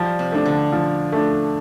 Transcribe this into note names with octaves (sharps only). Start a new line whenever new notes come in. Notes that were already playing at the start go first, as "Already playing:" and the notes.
Already playing: F3 G3
C3
A3 D4
D3
F3
A3 D4